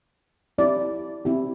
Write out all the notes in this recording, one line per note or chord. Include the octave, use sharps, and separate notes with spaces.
C4 E4 G4 D5
C4 E4 G4